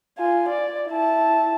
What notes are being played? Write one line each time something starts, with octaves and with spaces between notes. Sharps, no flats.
F4 G#5
D5
E4 A5